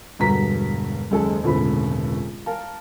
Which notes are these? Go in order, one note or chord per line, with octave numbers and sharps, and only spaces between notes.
E1 G2 D3 F#4 A#5 B6
F#1 D#2 G#3 A4
E1 C#2 A2 D3 C4 B5
A#4 F5 A5